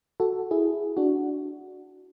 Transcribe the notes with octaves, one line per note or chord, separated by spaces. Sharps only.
F#4 A4
E4 G#4
D4 F#4